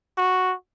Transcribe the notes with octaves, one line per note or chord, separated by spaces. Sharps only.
F#4